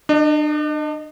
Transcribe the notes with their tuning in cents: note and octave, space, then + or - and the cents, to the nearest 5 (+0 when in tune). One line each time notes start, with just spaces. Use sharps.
D4 +35 D#5 -15